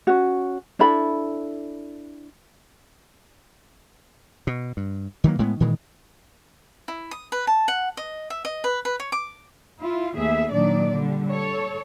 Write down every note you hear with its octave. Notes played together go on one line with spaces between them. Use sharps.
C#4 F#4
D4 E4 A4 B5
B2
G2
D#3 E3 F#3 A#3
A2 G#3 A#3 B3
A#2 D#3 E3 G#3
E4
D#6
B4
A5
F#5
D#5
E5
D#5
B4
B4
C#5
D6
E4 F4
D#2 A3 B3 G#4 E5
A#2 D#3 F#3 D4 D5
D3 G3
A4 C#5